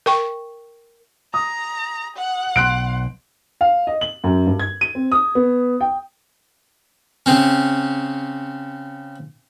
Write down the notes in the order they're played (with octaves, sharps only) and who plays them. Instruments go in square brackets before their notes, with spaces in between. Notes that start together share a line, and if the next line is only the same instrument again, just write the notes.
[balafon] A#4 G5 C#6
[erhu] A#5 [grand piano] D#6
[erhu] F#5
[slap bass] B1 [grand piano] C6 F#6 D7
[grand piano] F5
D#5
F#7
F#2
G2
G#6
D#7
C4
D#6
B3
G5
[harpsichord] C#3 C4 C#4